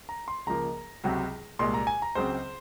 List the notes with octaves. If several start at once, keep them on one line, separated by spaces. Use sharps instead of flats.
A#5
C6
C#2 C#3 F3 A#3 A#5
C#2 C3 F#3 C4
C2 A#2 G#3 C6
A#5
G#5
A#5
C#2 C#3 F#3 C4 C5